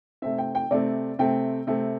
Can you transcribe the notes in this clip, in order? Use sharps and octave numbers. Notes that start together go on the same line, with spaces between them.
C3 A3 C4 E5
G5
G5
C3 A3 C4 D5
C3 A3 C4 G5
C3 A3 C4